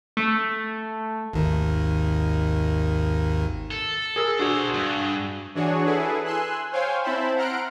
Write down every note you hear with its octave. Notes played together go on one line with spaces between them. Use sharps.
A3
G#1 D#2 D#3
A4
G#4 A#4 E6
D4 F#4 G#4 C5 D5
G2
E3 D4 F#4 G#4 C#5
E4 G#4 A4 B4
G#5 C6 E6 F#6
C5 C#5 F5 G5 G#5 C6
C4 E4 C5 E5 A5 B5
F#5 A#5 C6 F6 F#6 D7